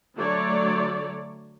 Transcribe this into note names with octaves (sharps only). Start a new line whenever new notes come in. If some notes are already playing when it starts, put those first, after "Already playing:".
D3 F#3 A3 C#5 D5